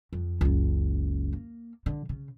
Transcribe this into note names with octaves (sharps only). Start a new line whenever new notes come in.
F2
F#1 C#2
A#3
D3
C#3